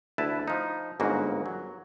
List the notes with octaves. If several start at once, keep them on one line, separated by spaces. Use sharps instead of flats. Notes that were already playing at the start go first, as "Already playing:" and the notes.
D2 E4 B4 A5
F3 D#4
G1 G#2 C#3 A#3 F#4
F#3